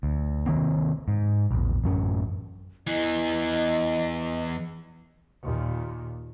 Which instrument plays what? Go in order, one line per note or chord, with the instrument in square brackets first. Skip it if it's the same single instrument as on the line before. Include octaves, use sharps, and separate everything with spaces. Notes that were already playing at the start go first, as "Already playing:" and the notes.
[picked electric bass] D2
C3 D#3 A#3 C4
G#2
A#1 E2
A1 F#2 C#4
[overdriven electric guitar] E2 E3 [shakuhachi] D#5
[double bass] D#2 A#2